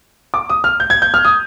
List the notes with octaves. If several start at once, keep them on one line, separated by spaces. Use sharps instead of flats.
D6
D#6
F6
G6
G#6
G6
F6
D#6